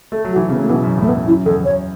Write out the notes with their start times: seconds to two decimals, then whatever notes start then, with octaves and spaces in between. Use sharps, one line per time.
0.12 A3 A4
0.24 F#3
0.32 F#4
0.36 E3
0.49 C#3 F#3 B3
0.59 F#3 A3
0.69 B2 E3 B3
0.84 F#2 B2
0.98 E2 A2 A3
1.08 B3
1.12 F#2
1.27 F#2 E4
1.46 E2 A4
1.60 E2
1.65 F#2 C#5